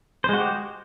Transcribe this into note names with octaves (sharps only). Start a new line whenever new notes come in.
G#3 F#4 G4 C5